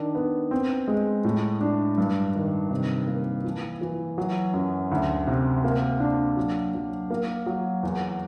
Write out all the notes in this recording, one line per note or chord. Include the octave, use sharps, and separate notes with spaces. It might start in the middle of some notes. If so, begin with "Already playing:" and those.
Already playing: D#3 D4
B3
C4
G#3
A2
D4
G2
D#3
C3
A#3
E3
E3
F#3
F#2
D2
C3
A#3
D4
F#3
F#3
A#3
F#3
E2